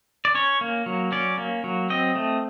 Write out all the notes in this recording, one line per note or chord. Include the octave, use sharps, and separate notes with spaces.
D5
C#4 C#5
A#3
F#3
C#4 D5
A#3
F#3
C4 D#5
A3